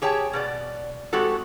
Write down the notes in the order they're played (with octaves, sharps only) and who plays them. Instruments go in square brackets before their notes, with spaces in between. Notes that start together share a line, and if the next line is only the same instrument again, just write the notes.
[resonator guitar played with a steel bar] G4 G#4 C#5 G5 A5
B2 B3 D5
G#3 C4 F#4 G4 A4